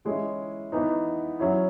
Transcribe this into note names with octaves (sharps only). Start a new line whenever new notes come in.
E3 G#3 C#4 E4
E3 B3 D#4
F#3 C#4 E4